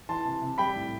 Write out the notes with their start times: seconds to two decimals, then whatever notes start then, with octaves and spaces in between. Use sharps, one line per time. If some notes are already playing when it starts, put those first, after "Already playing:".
0.09 E3 A5 C6
0.25 C3
0.42 C3
0.58 G3 G5 B5
0.76 A2